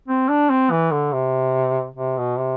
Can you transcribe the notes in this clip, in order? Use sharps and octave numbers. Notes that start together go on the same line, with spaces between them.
C4
D4
C4
E3
D3
C3
C3
B2
C3